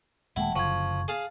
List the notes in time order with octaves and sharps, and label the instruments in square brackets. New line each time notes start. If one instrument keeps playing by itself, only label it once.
[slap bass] D#1 G#3 A#3 [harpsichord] E4 [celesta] F#5 G5 A5
[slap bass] F#1 F#2 D3 [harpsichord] F3 [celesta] C#6 G#6
[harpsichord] G#4 F5 A5